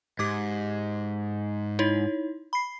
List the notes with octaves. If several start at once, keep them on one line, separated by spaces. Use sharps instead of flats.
G#2 G4 D6 G#6
D#4 E4 C#5
B5 C7